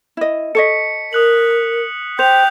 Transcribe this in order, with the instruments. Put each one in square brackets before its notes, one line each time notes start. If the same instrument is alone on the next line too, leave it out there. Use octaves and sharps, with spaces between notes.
[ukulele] E4 D#5
[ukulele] A4 C#5 D#5 [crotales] B6 C#7
[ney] A#4 [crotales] D#6 F#6 F#7
[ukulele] C5 [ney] G5 [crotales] G6 F7